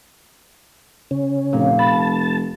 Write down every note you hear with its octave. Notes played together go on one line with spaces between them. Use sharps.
C#3 C#4
F1 A#2
A5 B5